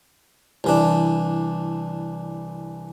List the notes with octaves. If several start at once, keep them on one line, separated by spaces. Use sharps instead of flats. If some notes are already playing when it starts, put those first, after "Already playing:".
C2 E3 D4